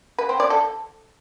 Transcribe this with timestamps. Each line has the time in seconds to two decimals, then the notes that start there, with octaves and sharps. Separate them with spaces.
0.18 B4
0.29 C4
0.40 D5
0.50 A4